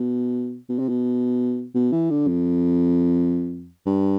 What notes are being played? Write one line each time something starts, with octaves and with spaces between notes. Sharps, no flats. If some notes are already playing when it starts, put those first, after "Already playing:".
Already playing: B2
B2
C3
B2
B2
E3
D3
F2
G2